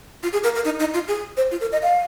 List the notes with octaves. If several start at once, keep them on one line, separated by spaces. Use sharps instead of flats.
F4
G#4
A#4
A#4
D#4
D#4
F4
G#4
C5
F4
A#4
D#5
F5